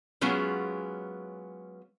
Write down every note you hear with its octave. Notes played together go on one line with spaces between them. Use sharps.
F#3 G#3 B3 C#4 F4